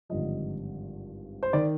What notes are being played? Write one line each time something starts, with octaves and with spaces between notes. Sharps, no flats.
G#1 G2 D3 F3 D#5
C5
D#3 D5